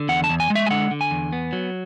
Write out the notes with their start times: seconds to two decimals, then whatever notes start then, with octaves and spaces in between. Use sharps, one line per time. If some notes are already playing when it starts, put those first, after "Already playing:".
Already playing: D3
0.09 E2 F#5
0.24 A5
0.29 E2
0.40 G#5
0.50 G#3
0.55 E5
0.66 G#5
0.70 D3 F#5
0.91 D3
1.01 G#5
1.11 E2
1.33 B3
1.53 F#3